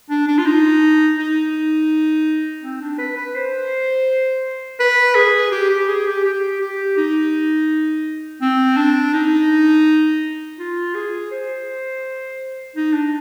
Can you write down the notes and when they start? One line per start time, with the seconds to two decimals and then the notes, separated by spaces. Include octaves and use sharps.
0.10 D4
0.28 D4
0.38 F4
0.45 D#4
1.18 D#4
2.63 C4
2.81 D4
2.99 B4
3.17 B4
3.36 C5
4.80 B4
5.16 G#4
5.52 G4
5.70 G4
5.88 G#4
6.07 G4
6.24 G4
6.61 G4
6.97 D#4
8.41 C4
8.77 D4
9.14 D#4
10.59 F4
10.95 G#4
11.31 C5
12.76 D#4
12.93 D4